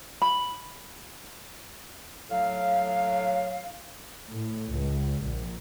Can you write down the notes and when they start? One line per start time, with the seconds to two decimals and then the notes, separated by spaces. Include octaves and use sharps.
0.22 B5
2.31 A2 F#3 F5
4.29 A2
4.75 C#2
5.23 A#1